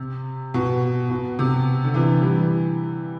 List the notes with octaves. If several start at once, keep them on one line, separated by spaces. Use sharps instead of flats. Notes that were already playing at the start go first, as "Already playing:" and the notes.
Already playing: C3
B2
B2
C3
D3
C3 E3
E3 G3